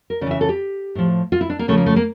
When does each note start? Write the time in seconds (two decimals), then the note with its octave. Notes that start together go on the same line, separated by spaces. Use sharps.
0.10 A#4
0.21 C#3 D5
0.26 E3 E5
0.41 A4
0.49 G4
0.95 A2 F3
1.32 F4
1.41 E4
1.50 D4
1.59 A#3
1.68 C#3 A3
1.72 F3
1.77 A#3
1.86 A3
1.96 A#3